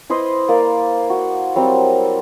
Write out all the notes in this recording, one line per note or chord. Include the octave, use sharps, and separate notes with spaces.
E4 B4 C5 D#5
A#3 D5
F#4
F#3 G3 C4